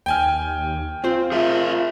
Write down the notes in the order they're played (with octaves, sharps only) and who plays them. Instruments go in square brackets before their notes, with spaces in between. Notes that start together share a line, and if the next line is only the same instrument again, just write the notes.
[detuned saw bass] D#2 [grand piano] G5 G#5 F6
[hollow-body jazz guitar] C4 C5 [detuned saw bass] F4
[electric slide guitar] G#4 A#4 E5